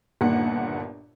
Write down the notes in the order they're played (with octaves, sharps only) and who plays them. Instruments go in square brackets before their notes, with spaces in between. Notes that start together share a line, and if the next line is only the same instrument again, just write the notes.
[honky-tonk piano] G1 D#2 A#2 F#5